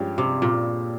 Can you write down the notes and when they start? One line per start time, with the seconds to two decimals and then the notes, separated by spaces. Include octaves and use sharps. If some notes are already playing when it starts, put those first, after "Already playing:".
Already playing: G2 F3 G#3 C#4 G4
0.18 C3
0.42 A#2